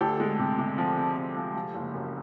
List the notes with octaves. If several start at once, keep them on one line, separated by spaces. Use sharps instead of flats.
D2 G4 A4
G#3
C3
C3
F3
C3
F3
F3
F3
F#1
F#2